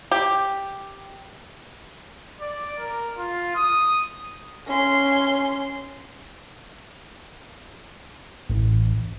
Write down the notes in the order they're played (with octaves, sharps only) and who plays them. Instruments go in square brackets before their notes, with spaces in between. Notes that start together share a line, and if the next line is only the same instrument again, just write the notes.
[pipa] G4
[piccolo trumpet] D5
A#4
F4
D#6
[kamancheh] C#4 C6
[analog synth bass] A1